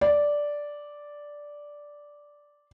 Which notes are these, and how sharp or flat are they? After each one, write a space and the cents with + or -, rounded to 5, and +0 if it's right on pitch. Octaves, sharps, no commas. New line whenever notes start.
D5 -5